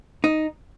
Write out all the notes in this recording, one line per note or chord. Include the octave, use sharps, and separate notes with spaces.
D#4